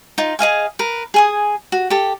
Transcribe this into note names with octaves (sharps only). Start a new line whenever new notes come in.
D#4 F4
G#4 D#5 F5 G#5
A#4 B4
G#4 G#5 D#6
F#4
G4 A4